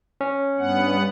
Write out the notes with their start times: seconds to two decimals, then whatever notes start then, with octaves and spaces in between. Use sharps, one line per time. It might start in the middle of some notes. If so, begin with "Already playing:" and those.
0.21 C#4
0.58 G2 B3 F#5